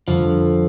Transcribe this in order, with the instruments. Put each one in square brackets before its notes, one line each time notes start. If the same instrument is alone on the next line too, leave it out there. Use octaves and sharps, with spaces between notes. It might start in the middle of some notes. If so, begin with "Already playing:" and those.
[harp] F2 D3 G3 [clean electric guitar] F3